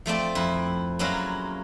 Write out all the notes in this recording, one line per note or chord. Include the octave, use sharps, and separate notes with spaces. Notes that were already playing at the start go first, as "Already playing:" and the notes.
F3 A3 C4 D5
F2 E4
F#3 G#3 A#3 C#4 E4 F4